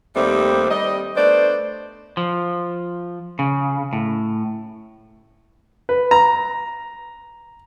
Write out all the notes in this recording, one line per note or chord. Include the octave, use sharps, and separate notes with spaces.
D#2 G3 A3 C4
G3 D#5
A3 B3 D4 C5 D5
F3
C#3
A2
B4
A#5